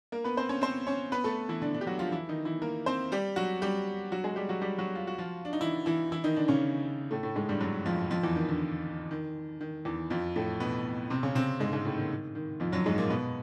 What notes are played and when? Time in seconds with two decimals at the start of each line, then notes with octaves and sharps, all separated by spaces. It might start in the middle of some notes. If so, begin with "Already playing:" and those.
0.12 A#3 A#4
0.24 B3 B4
0.37 C4 C5
0.49 C#4 C#5
0.61 C4 C5
0.87 C#4 C#5
1.12 B3 B4
1.24 A3 A4
1.49 E3 E4
1.62 D3 D4
1.74 D3 D4
1.81 G4
1.87 F#3 F#4
1.99 F3 F4
2.11 E3 E4
2.29 D#3 D#4
2.45 E3 E4
2.62 A#3 A#4
2.86 C4 C5
3.12 G3 G4
3.36 F#3 F#4
3.62 G3 G4
4.12 F#3 F#4
4.24 G#3 G#4
4.36 G3 G4
4.49 F#3 F#4
4.61 G3 G4
4.78 F#3 F#4
4.95 F4
5.07 F#4
5.18 F3 F4
5.45 D4
5.53 D#4
5.61 E3 E4
5.86 E3 E4
6.12 E3 E4
6.24 D#3 D#4
6.36 D3 D4
6.48 C#3 C#4
7.11 A2 A3
7.23 A2 A3
7.35 G#2 G#3
7.49 G2 G3
7.60 F#2 F#3
7.85 F2 F3
8.10 F2 F3
8.23 E2 E3
8.36 D#3
8.48 D3
9.11 D#3
9.61 D#3
9.85 E2 E3
10.10 F2 F3
10.36 A2 A3
10.60 B2 B3
11.10 C3 C4
11.23 C#3 C#4
11.35 C3 C4
11.60 G#2 G#3
11.73 G#2 G#3
11.85 A2 A3
11.97 D#3
12.10 D#3
12.35 D#3
12.60 F2 F3
12.72 F#2 F#3
12.86 G#2 G#3
12.98 A#2 A#3
13.10 B2 B3